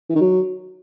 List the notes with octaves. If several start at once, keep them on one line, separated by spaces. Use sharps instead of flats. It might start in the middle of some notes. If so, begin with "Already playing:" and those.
E3
D#3
F#3